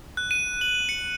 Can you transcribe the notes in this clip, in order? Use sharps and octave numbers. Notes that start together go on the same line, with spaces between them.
F#6
D#7
F#7
C#7